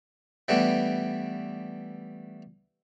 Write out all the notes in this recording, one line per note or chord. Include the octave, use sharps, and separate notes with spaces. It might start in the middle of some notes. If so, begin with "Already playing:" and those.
E3 G3 A3 B3 D4